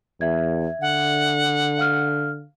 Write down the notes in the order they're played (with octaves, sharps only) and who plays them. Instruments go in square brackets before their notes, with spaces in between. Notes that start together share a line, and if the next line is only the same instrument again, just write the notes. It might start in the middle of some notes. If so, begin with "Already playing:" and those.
[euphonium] E2 [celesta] E5 G#6
[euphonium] D3 [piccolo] F#5
[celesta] F5 F6